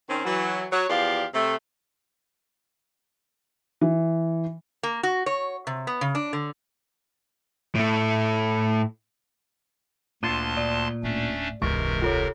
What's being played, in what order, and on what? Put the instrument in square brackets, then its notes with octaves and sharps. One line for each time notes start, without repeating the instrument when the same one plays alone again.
[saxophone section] D#3 C4 C#4
E3 F#3
F#3 C#5
E2 F3 G4 D5 F5
C3 A3
[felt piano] E3
[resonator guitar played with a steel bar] A#3
F#4
C#5
C3
B3
C#3
D4
D3
[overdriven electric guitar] A2 A3
[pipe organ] D2 A5 C6 [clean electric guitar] A#2 D4 F4 [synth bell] D#7
[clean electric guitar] A#2 [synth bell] D5
[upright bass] D1 A2 [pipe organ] A3 C#4 D4
[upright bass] E1 C#2 [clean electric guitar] G#2 E3 G#3 [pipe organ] C3 A#4 [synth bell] C#6
[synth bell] F4 A4 C#5